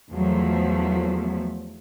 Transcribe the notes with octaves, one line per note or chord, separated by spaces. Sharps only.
E2 F3 F#3 A3